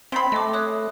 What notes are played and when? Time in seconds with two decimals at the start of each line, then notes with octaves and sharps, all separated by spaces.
0.12 C#3 C4 B5 C6 B6 C7
0.32 A3 D#5 D6
0.53 C#5 D#6 F#6